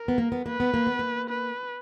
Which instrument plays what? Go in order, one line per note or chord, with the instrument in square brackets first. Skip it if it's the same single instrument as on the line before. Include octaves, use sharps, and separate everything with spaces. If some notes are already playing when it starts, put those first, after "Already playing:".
Already playing: [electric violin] A#4
[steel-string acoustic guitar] B3
A#3
B3
[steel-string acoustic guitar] A#3 [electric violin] B4
[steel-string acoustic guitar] B3
A#3
B3
A#3
[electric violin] B4